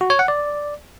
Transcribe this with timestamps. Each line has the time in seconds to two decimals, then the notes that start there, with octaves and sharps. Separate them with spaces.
0.01 F#4
0.10 C#5
0.19 F#5
0.28 D5